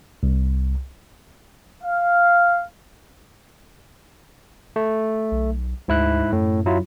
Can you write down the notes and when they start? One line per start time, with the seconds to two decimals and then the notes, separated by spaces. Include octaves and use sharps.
0.23 C2
1.83 F5
4.76 A3
5.31 B1
5.88 D2 G#2 E4 F#6
6.32 F#2 A2
6.66 F#3 E4 F4